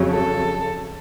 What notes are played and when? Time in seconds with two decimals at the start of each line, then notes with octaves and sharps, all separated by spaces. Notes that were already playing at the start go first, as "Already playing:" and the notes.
Already playing: F2 C#3 F#3
0.12 A4